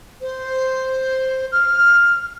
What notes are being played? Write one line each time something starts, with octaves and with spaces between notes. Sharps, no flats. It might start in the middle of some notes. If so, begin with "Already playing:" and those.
C5
F6